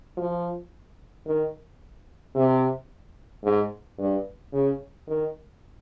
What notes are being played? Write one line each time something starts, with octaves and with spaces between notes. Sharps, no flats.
F3
D#3
C3
G#2
G2
C#3
D#3